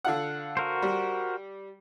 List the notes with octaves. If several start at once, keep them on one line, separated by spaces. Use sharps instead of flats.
D3 F4 F#5
F#4 A#4 C5
G3